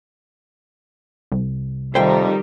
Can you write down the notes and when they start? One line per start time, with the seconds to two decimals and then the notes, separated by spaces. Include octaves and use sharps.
1.32 C2
1.95 F2 D#3 G3 D#4 C5 E5 G5